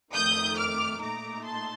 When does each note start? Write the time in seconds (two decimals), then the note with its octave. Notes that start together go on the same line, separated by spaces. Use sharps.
0.14 F2 D#3 A3 D#6 G6
0.58 D6 F6
1.01 A#2 A3 D#4 A#5 D6
1.45 A5 C6